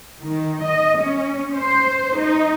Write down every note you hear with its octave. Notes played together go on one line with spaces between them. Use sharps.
D#3
D#5
C#4
C5
D#4